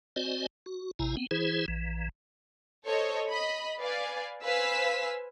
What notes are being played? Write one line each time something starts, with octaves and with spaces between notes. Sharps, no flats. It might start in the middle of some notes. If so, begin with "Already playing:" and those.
C4 F#4 C5 D5 D#5 G#5
F#4
A1 C3 E4 G#5 A#5
B3 C4
E3 E4 G#4 C5
A#1 E3
A4 C5 C#5 D#5
D#5 B5
B4 D5 F5 G#5
B4 C5 F5 G#5 E6 B6